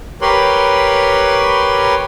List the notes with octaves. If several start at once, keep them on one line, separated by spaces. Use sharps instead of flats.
G4 A#4 B4 C#5 B5 C6